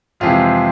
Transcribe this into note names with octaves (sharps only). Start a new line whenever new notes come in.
F2 C3 E3 G#3 C4 F4